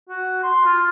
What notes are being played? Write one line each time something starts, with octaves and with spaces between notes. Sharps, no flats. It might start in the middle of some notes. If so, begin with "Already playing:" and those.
F#4
C6
F4